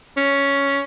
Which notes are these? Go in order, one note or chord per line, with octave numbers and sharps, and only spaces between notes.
C#4